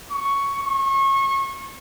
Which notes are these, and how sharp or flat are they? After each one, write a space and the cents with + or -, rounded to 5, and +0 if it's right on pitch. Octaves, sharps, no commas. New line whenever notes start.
C#6 +5
C#6 -30